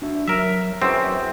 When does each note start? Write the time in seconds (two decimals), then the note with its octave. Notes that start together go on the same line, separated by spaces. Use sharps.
0.02 D4 F#4 E5
0.28 F#3 A#4 E5
0.82 F#2 C4 E4 G#4 B4